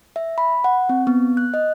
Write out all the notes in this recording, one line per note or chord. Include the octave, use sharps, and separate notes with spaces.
E5
B5
F#5
C4
B3
F#6
D#5